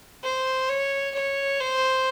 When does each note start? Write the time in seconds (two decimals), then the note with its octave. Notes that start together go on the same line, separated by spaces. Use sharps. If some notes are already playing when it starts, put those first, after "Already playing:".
0.24 C5
0.69 C#5
1.14 C#5
1.60 C5